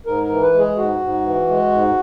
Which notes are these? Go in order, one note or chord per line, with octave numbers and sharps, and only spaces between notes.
G#2 A#4
A#4
E3
B4
G#3
G#4
G#2 F#4
G#2
E3
G#3
G#2